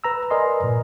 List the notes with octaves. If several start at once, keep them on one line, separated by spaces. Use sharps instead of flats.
B4 A#5 E6
A#4 B4 D5 D#5 G#5 C6
G2 A#2